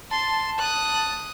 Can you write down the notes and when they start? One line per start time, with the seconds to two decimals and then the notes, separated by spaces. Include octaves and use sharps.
0.11 A5 C6
0.59 D#6 F#6